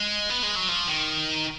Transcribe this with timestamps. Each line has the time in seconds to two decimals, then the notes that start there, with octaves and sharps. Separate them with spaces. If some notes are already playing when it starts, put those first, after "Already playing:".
Already playing: G#3
0.30 B3
0.43 G#3
0.56 F#3
0.69 F3
0.88 D#3